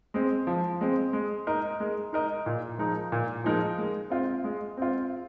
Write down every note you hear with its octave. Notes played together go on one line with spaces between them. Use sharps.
G#3 C4
F3
G#3 C4
G#3
D#4 A#4 D#5
G#3
D#4 A#4 D#5
A#2
F3 G#3 D#4 A#4
A#2
F3 G#3 D#4 A#4
G#3
C4 F4
G#3
C4 F4